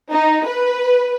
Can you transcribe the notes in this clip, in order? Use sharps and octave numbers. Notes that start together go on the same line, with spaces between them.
D#4
B4